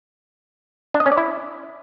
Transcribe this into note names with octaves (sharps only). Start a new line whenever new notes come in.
D4
D#5
C#4
D5
E4